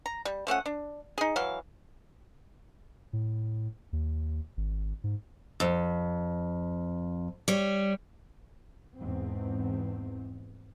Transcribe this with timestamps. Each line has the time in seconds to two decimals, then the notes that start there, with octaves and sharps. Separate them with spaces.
0.06 A#5
0.25 G3
0.47 F3 A3 C#4 F#5
0.66 D4
1.18 D#4 G#4
1.36 E3 F#3 F5
3.13 A2
3.93 D#2
4.57 G#1
5.04 G#2
5.60 F2
7.48 G3 C#5
8.97 E2 G#2 C4